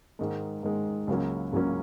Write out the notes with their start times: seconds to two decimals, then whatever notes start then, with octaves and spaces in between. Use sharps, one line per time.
0.19 G#2 D#3 G#3
0.63 G#2 D#3 G#3
1.07 C#2 C#3 F#3 A#3 C#4
1.52 C#2 C#3 F#3 A#3 C#4